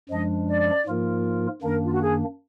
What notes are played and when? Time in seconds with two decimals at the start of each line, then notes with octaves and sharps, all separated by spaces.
0.10 F#2 F3 G#3 D4 D#5
0.48 D5
0.86 G#2 F3 A#3 F4 A#4
1.62 F#2 D#3 A#3 D4 A#4
1.85 F4
1.92 F#4
2.01 G#4